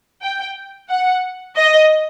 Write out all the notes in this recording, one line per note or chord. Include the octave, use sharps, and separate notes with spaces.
G5
F#5
D#5